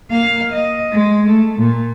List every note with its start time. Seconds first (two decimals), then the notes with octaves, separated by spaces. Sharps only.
0.10 A#3 F5
0.53 D#5
0.92 G#3
1.28 A3
1.59 A#2